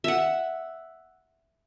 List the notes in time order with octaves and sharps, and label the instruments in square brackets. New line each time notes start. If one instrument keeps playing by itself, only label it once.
[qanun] E5 F#5